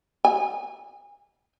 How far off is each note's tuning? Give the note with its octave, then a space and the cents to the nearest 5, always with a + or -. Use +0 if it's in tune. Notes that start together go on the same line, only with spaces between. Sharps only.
G#5 -35